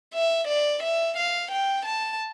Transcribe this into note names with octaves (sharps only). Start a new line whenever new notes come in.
E5
D5
E5
F5
G5
A5